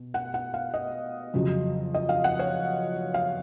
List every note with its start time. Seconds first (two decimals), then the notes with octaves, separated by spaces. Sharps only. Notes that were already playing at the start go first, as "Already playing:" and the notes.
Already playing: B2
0.14 F#5
0.34 F#5
0.54 F5
0.74 D#5
1.34 F2 C#3 F#3
1.94 D#5
2.09 F5
2.24 F#5
2.39 C#5
3.14 F5